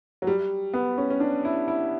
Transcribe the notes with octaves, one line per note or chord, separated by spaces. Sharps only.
F#3
G3
B3
C#4
C#4
D4
E4
E4